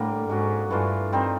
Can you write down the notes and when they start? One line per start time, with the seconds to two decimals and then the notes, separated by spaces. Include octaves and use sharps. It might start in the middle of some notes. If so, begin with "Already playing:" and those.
Already playing: A2 D3 G3 A#3 D4
0.29 G#2 G#3 C#4 F#4
0.70 G2 E3 A3 D4 F4
1.12 G3 C4 D#4